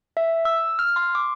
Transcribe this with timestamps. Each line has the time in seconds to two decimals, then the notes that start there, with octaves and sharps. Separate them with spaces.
0.17 E5
0.45 E6
0.79 F6
0.96 C6
1.15 D6